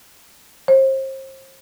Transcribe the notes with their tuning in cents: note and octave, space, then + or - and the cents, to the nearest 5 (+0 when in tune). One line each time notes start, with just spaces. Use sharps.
C5 +35